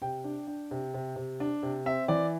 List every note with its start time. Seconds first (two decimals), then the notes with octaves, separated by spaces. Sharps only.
0.02 C3 G5
0.24 D4
0.47 D4
0.71 C3
0.94 C3
1.16 C3
1.40 D4
1.63 C3
1.86 C4 E5
2.08 E3 D5